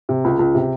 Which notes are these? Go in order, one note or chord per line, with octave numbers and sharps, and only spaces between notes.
C3
C#2
C#2
C3